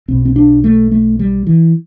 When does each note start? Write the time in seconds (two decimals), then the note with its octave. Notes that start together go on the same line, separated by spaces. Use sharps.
0.08 B1 B2 C4
0.25 C4
0.36 D4
0.64 A3
0.91 A3
1.19 G3
1.47 E3